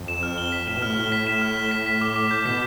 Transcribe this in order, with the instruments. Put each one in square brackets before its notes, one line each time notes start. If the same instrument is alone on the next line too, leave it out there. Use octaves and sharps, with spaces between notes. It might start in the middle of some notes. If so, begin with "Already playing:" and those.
Already playing: [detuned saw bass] F2
[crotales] E7
F6
G7
B6
[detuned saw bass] A2 [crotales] E7
[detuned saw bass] B2
[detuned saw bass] A2 [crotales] F6
[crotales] G7
B6
E7
F6
G7
B6
B6
D6
D6
G6
[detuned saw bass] B2 [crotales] B6